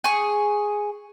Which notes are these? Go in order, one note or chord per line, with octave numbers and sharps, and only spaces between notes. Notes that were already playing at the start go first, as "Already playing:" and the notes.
G#4 C#6